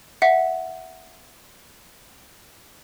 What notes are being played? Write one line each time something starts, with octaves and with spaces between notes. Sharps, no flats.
E5 F#5